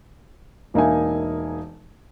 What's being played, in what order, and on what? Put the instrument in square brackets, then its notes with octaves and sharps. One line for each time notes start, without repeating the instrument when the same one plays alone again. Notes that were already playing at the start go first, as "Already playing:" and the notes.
[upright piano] E1 A#3 D#4 E5 G#5